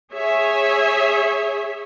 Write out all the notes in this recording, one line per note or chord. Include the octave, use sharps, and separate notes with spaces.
G#4 C#5 E5